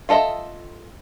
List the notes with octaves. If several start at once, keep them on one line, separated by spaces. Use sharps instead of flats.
F4 A4 D#5 E5